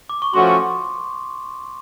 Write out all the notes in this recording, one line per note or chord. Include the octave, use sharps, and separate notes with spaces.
D6
C#6
F3 A3 C#4 F#4 C6